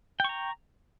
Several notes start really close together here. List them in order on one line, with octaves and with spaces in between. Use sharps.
G5 C#6 A#5